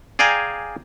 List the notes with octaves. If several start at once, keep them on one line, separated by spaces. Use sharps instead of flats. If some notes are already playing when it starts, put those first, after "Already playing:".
G#4 D5 F5 G5 G#5 A#5